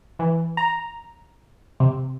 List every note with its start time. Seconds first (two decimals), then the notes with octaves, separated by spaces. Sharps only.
0.19 E3
0.57 A#5
1.80 C3